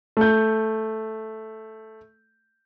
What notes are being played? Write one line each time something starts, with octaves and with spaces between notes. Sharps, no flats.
A3 G6